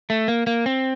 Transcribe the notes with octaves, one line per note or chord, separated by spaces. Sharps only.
A3
A#3
A#3
C4